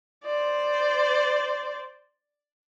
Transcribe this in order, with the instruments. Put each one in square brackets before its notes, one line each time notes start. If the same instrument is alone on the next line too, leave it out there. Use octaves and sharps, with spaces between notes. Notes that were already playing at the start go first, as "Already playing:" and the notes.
[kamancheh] C5 D5